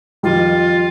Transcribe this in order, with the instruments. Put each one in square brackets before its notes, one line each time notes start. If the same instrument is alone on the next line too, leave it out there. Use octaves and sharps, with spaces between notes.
[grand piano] F2 D#3 G3 [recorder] F4